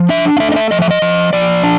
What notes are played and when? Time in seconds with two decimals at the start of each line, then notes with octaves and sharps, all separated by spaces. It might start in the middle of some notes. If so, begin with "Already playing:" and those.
Already playing: F3
0.09 D4 E5
0.37 F5
0.40 A3 E5
0.52 D#5
0.56 E5
0.71 F3 D#5
0.82 E5
0.91 D#5
1.02 F3
1.33 F3 D5
1.63 D4